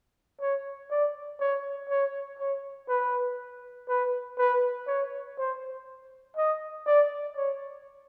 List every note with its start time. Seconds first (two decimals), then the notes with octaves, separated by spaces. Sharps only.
0.41 C#5
0.91 D5
1.40 C#5
1.90 C#5
2.39 C#5
2.89 B4
3.89 B4
4.38 B4
4.87 C#5
5.38 C5
6.37 D#5
6.87 D5
7.36 C#5